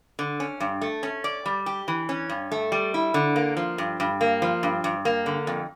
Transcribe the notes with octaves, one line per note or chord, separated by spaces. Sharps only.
D3
C#4
G2
A3
C#4
D5
G3
G4
E3
C#4
G2
A3
G3
E4
D3
A#3
F3
G2
G2
A#3
F3
G2
G2
A#3
D3
F2